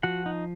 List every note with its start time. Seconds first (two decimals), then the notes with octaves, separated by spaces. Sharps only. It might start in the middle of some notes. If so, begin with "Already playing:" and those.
0.03 F3 F#4 F#5
0.26 D#4